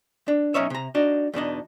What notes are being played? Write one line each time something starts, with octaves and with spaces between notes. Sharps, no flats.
D4
B1 F3 C#4 D#4 C#5 E5
C3 A#5
D4 D#4 F#4
E2 B2 D4 D#4